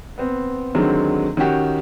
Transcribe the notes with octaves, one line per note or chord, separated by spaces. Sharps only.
B3 C4
D3 D#3 F#3 G#3 C4
D#3 C#4 F#4 G4